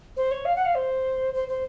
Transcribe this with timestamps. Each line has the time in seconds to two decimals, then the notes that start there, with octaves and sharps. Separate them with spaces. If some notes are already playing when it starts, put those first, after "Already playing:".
0.16 C5
0.31 C#5
0.45 F5
0.56 F#5
0.65 F5
0.75 C5
1.34 C5
1.48 C5